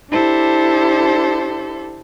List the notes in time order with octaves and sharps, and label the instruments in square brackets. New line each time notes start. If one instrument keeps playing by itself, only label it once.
[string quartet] D4 E4 G4 A4 C5